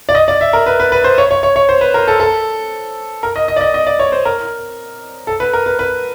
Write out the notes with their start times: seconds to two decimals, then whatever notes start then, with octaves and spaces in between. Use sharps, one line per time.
0.09 D5
0.15 D#5
0.28 D5
0.41 E5
0.53 A#4
0.66 B4
0.80 B4
0.92 B4
1.04 C5
1.18 C#5
1.31 C#5
1.43 C#5
1.56 C#5
1.69 C5
1.81 B4
1.94 A#4
2.08 A4
2.20 A4
3.23 A#4
3.36 D#5
3.48 D#5
3.56 D5
3.61 D#5
3.74 D#5
3.87 D5
3.99 C#5
4.12 C5
4.25 A#4
5.27 A4
5.40 B4
5.53 A#4
5.66 B4
5.79 B4